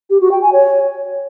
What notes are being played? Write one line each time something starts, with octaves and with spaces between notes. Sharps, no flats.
G4
F#4
G5
G#5
C#5